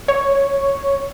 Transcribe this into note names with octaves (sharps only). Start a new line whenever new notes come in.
C#5